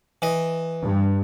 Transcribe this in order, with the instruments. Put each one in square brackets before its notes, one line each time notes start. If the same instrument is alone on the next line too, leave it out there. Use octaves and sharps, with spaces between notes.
[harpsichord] E3 D#5
[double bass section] G2